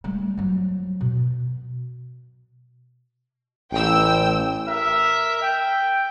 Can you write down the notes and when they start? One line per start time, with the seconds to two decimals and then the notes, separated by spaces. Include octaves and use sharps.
0.04 G3 A3
0.37 F3 F#3
1.01 B2
3.72 A1 G5 E6
4.67 A#4 E5
5.41 G5